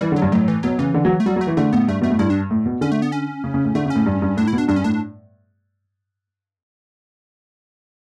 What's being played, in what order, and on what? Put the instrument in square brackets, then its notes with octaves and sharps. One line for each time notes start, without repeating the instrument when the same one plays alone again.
[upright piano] E3 [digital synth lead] G3
[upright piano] D3
[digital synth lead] F#3
[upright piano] G2
[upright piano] A2 [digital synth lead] F#3
[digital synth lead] E3
[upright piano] B2 [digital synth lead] F#3
[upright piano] C#3 [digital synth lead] E3
[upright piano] D3
F#3
[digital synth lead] A3
[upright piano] F#3 [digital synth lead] G3
[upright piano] F#3
[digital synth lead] A3
[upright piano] E3
[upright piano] D3 [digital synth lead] A3
[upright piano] A2 [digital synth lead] B3
[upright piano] G2 [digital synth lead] A3
[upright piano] B2 [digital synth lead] A3
[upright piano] A2
[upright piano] G2 [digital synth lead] E4
[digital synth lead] D4
[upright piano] A2
B2
[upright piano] D3 [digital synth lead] C#4
[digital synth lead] A3
B3
C#4
[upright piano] C#3
C#3
A2
[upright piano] D3 [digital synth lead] A3
[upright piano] C#3
[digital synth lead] C#4
[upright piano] A2
G2
G2
[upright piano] A2 [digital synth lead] D4
[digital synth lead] E4
[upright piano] B2
[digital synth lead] D4
[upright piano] G2 [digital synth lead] D4
[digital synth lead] C#4
[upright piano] A2 [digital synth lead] D4